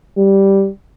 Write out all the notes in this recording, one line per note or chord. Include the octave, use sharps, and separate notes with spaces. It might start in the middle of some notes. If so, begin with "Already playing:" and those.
G3